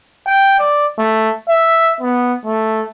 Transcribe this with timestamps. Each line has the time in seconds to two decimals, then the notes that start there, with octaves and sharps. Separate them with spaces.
0.26 G5
0.59 D5
0.99 A3
1.49 E5
2.00 B3
2.45 A3